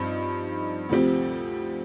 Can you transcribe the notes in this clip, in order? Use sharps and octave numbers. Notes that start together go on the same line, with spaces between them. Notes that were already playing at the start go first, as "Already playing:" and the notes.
Already playing: G2 F3 C4 D#4
D2 C3 F3 C4 G4